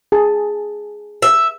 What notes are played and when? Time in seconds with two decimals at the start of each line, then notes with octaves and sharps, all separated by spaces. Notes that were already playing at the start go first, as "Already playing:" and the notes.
0.12 G#4 A5
1.22 E5